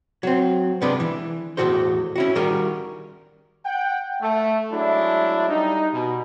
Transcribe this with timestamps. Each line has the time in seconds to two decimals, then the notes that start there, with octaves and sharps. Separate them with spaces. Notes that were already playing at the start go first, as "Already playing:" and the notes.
0.23 F#3 C4
0.81 C3 G#3 B3 D4 B4
1.00 E3
1.57 E2 A2 C3 F#4 A4 C5
2.16 C#4 E4 F#4
2.35 D#3 G3 F#4 G#4 A#4
3.65 F#5 G5
4.21 A3
4.71 F#3 G#3 A3 D4 E4
5.50 G3 D#4
5.93 B2